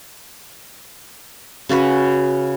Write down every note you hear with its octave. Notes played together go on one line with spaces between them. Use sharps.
C#3 C#4 F#4 B4